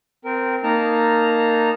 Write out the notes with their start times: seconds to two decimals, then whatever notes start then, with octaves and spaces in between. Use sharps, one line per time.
0.25 C4 A#4
0.63 A#3 D#4 A5 A#5 F6